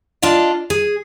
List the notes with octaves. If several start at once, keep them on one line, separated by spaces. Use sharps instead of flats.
D4 F4 D5 D#5
G#4